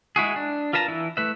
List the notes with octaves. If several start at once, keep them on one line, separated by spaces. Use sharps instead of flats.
G#3 E4 F#4 G#4
D4
F4 A#4 B4 A5 A#5
E3 E4
A3 B4 E5